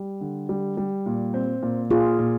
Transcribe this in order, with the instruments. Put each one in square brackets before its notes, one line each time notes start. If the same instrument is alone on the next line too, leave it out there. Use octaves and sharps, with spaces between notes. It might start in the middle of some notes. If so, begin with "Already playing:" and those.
Already playing: [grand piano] G3
D3
G3
G3
A#2
C4
A#2
[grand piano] A#2 [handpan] F4 G#4
[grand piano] A#2